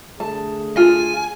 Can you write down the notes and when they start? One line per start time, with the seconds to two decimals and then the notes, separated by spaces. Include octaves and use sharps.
0.20 D3 A3 G#4 A5
0.77 F4 A4 G#5